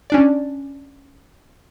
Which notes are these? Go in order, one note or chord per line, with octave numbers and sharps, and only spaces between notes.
C#4 D4 D5